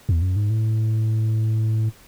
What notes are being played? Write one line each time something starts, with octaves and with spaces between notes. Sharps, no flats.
E2
F#2
G#2
A2